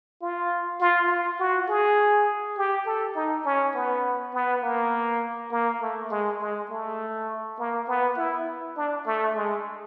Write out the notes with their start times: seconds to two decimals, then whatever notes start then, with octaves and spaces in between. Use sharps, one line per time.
0.22 F4
0.81 F4
1.09 F4
1.40 F#4
1.69 G#4
2.58 G4
2.86 A4
3.16 D#4
3.46 C#4
3.75 B3
4.34 B3
4.63 A#3
5.52 A#3
5.81 A3
6.10 G#3
6.41 G#3
6.70 A3
7.59 A#3
7.89 B3
8.17 E4
8.76 D4
9.06 A3
9.35 G#3